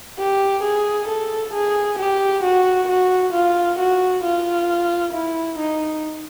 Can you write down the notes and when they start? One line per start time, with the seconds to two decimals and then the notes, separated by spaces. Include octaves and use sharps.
0.19 G4
0.63 G#4
1.08 A4
1.53 G#4
1.99 G4
2.44 F#4
2.88 F#4
3.34 F4
3.79 F#4
4.24 F4
5.13 E4
5.59 D#4